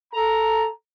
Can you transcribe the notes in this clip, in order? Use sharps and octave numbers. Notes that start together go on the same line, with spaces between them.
A4 A#5